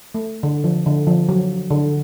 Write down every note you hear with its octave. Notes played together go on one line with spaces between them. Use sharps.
A3
D3
F3
D3
F3
F#3
D3